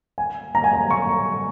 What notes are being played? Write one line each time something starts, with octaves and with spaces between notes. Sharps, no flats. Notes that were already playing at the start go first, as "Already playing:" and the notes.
G#5
A#5
G#5
A#5
C#6